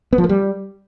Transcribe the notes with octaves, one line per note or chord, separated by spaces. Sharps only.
B3
F3
A#3
G3